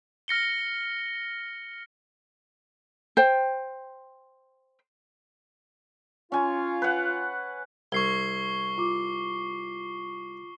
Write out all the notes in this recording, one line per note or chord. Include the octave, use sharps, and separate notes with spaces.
F6 A#6 C#7 G7
C5 G5
C#4 F4 G#5
B4 F#5
C2 C#6 G#6 C7 G7
F4 D6